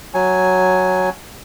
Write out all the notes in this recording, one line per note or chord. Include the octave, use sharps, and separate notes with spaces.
F#3 G#5